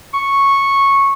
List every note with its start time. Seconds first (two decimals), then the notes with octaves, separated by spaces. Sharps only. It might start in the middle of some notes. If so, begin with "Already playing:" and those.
0.14 C#6